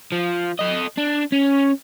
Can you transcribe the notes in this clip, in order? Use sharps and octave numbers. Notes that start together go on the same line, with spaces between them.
F3
A4 D#5
D4
C#4